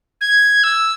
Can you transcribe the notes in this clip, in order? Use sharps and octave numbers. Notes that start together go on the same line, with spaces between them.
G#6
E6